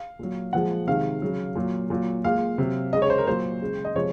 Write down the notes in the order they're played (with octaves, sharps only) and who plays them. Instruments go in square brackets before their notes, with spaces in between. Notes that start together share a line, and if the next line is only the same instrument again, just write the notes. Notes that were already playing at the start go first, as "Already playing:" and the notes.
Already playing: [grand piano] F5
A#2 F#3
A#2 F3 G#3 F#5
C3 D#3 G#3 F5
C#3 F#3
A#2 F#3
A#2 F#3
A#2 G#3 F5
C3 F#3
C#3 G#3 D#5
C#5
C5
A#4
A#2 F#3 C5
C#3 G#3
D#5
C3 F3 G#3 C#5